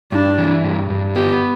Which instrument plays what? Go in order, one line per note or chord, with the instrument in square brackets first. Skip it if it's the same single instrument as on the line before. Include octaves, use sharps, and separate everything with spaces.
[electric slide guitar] G2 [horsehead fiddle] D4
[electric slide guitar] E3
G2
G2
[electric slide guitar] B3 [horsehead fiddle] G4